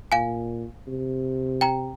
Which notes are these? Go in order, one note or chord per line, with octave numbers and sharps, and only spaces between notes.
A#2 F5 G#5
C3
G5 A#5